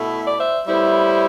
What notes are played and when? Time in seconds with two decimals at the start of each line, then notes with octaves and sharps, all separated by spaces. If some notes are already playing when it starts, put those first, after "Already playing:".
Already playing: B2 A3 E4
0.26 D5
0.37 C5 E5
0.67 A2 G3 B3 E4 C5 E5